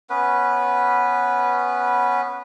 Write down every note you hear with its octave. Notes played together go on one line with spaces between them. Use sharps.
B3 C#4 B4